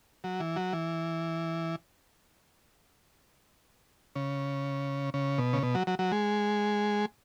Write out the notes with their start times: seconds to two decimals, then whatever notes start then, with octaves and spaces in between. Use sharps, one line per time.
0.24 F#3
0.40 E3
0.56 F#3
0.73 E3
4.15 C#3
5.14 C#3
5.38 B2
5.53 C#3
5.63 B2
5.75 F#3
5.87 F#3
5.99 F#3
6.12 G#3